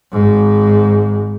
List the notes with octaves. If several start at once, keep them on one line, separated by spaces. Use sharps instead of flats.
G#1 G#2